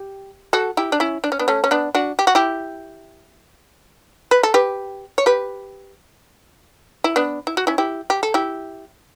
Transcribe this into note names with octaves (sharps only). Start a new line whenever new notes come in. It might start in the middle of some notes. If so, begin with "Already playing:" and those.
Already playing: G4
F#4 A4
E4 G4
D4
C#4 E4
D4
C#4
B3 D4
A3 C#4
C#4
B3 D4
D4 F#4
G4
F#4
E4 G4
B4
A4
G4 B4
C#5
G4 B4
E4
B3 D4
E4
F#4
C#4 E4
E4 G4
G4
A4
E4 G4